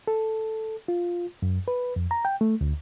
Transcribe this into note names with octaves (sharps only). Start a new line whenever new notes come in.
A4
F4
F#2
B4
F2
A#5
G5
A3
D2